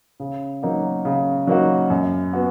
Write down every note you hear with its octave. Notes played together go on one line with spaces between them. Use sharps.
C#3
F#3 A#3 D#4 F#4
C#3
F#3 A#3 D#4 F#4
F#2
B3 F#4